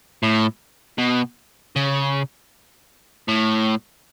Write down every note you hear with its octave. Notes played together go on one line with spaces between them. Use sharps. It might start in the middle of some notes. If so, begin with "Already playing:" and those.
A2
B2
C#3
A2